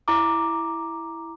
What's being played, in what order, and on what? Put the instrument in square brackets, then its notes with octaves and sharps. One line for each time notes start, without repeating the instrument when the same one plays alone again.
[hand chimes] E4 A#5 D6